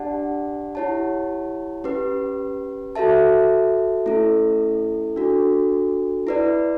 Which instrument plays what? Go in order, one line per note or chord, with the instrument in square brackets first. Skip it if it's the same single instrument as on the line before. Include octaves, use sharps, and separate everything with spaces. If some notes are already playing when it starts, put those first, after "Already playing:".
Already playing: [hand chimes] D4 G4 D5 F#5 A5
E4 G4 C#5 F#5 A5
C#4 G4 B4
F#4 A4 E5 A5
A3 C#4 E4 A4
D4 F#4 A4
E4 B4 D5